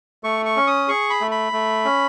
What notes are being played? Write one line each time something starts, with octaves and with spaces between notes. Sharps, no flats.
A3 C#6
C#6
C#4
D#6
G#4 C#6
B5
A3
B5
A3
C#4